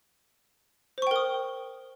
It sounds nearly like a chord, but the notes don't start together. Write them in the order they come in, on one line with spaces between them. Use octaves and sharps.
C5 C#6 G5 A#4 D#6